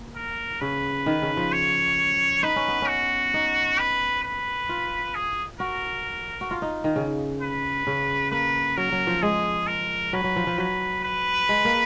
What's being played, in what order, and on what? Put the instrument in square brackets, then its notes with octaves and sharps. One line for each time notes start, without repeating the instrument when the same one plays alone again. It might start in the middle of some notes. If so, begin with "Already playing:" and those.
Already playing: [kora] A#3
[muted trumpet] A#4
[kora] C#3 [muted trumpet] B4
[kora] D#3
C#3
F3
[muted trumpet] C#5
[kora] D#4 [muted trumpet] B4
[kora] C#4
B3
C#4
[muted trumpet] F#4
[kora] D#4
[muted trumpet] B4
B4
[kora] F4
[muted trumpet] G#4
[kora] F#4 [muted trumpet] A#4
[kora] F#4
F4
D#4
D#3
C#3
[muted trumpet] B4
[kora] C#3
[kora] A#3 [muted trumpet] B4
[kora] F#3 [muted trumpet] A#4
[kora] F#3
F3
[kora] G#3 [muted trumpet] G#4
[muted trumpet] A#4
[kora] F#3 [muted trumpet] B4
[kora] F#3
F3
F3
[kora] F#3 [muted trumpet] B4
[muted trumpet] B4
[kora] G#3
A#3